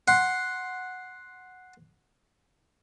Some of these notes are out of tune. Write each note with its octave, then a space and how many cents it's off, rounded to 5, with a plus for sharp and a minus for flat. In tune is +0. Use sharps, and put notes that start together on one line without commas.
F#5 -5 C6 +5